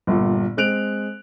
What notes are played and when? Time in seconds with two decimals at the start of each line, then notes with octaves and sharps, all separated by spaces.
0.07 G1 A#2
0.57 G#3 C4 F#6 D7 F7